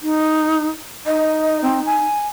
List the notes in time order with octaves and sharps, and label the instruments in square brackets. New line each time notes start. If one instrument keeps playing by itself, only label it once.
[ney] D#4
[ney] D#4 [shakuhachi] D#5
[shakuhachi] C4
G#5